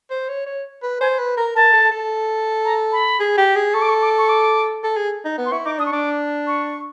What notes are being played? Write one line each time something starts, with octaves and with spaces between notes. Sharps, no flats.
C5
C#5
C#5
B4
C5 G#5
B4
A#4 A#5
A#4 A5
A4
A4
A#5
B5
G#4
G4
G#4
A4 C#6
D6
C#6
D6
C#6
D6
A4
G#4
D#4
B3
C6
E4 C#6
D#4 D6
D4 D#6
C#6
D4 D6
C#6